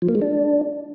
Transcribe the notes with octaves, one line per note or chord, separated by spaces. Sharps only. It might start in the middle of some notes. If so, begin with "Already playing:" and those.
F3
A#3
G#3
D4